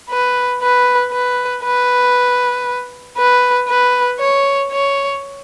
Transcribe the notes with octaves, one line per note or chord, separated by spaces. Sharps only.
B4
B4
B4
B4
B4
B4
C#5
C#5